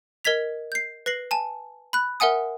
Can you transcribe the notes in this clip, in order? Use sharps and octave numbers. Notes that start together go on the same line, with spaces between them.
A#4 D#5 G#6 B6 F7
G6 C7
B4 A#6 C7 F#7
G#5 A5
B5 F#6
A#4 E5 F#5 G#5 D#6